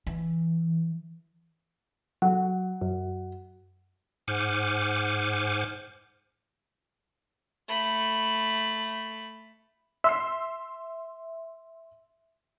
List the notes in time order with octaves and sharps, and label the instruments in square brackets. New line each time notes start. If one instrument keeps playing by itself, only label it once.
[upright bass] E3
[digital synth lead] F#3 [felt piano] F#5
[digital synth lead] F#2
[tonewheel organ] G#2 C5 F#5 G#5 D6 F6
[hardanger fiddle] A3 B5
[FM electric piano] E5 [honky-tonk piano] C6 E6 C7